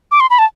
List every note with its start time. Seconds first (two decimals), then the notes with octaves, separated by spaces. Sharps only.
0.11 D6
0.20 C6
0.30 B5
0.39 A5